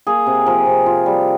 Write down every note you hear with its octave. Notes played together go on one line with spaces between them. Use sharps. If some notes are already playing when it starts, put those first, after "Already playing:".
A#3 G#4
C3
F3 A#4
C3
F4
G3